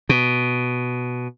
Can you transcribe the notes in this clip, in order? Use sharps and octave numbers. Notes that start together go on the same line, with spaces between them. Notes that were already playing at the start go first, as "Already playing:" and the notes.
B2